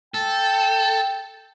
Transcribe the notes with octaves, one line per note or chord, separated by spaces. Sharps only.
A4 G5